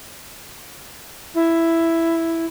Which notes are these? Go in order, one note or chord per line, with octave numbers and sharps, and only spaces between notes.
E4